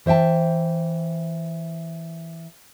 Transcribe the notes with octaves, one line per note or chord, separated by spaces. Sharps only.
E3 C5 E5 G5 A5